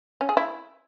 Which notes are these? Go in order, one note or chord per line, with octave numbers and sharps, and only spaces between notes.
C#4
G#4
E4